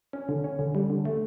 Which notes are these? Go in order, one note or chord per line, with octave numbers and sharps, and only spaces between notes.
C#4
D3
C#4
D3
G3
D3
A3